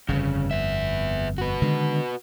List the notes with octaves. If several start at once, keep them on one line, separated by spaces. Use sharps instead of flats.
G1 F2 C#3
B3 E5
F#4 B4
D3 D#3 G#3